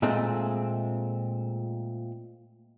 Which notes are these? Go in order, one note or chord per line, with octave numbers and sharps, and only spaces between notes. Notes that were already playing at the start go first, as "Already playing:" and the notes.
A#2 G#3 A3 C4